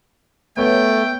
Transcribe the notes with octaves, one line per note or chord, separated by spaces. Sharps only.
A3 B3 C#5 G5